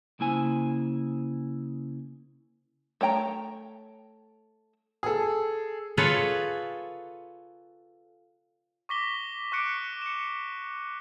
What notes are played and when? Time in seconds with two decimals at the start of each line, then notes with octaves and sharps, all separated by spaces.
0.20 C#3 A#3 E4 C5 G#5
3.01 A3 C#5 G5 A#5
5.03 G#4 A4
5.97 F4 G#4 A4 B4 C#5
8.89 C#6 D6 A#6 B6 G7
9.52 C#6 D6 F#6 C#7 D7
10.02 C#7 E7